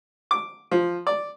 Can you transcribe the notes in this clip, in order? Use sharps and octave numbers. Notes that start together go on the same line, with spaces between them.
D6
F3
D5